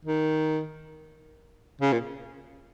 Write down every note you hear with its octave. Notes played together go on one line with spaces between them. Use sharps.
D#3
C#3
A#2